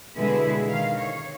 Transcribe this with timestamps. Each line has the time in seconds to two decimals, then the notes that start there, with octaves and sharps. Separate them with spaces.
0.16 B2 D3 G#3 E4 G#4 B4
0.66 D#3 F5
0.98 C#5